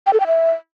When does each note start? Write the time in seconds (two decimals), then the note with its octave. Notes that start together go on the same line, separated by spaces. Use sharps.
0.07 G5
0.13 A4
0.20 G5
0.27 E5